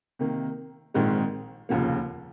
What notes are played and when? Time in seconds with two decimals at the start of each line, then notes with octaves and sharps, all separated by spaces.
0.19 C3 D#3 A#3
0.94 A#1 G#2 D#3 G#3 C4
1.69 F1 D#2 C#3 F3 A#3